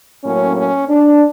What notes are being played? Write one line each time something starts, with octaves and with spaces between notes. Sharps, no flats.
A2 F#3 A#3 C#4
C#4
D4